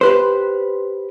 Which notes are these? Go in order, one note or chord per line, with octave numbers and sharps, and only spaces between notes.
G4 B4 C5